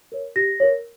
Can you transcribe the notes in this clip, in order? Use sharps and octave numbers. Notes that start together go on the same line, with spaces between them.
A#4 C#5
G4 A#6
A#4 C#5